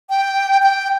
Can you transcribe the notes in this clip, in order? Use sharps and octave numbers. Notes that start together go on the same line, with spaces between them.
G5
G5